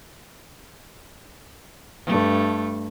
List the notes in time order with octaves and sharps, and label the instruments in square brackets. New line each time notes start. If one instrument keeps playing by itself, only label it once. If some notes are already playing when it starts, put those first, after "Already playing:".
[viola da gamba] G2 A3